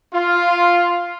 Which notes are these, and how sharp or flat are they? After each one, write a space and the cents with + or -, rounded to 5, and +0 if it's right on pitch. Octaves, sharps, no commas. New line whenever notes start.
F4 +0